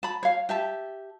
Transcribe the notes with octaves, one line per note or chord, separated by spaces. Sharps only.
A5 B5
C#5 F5
G4 E5 A5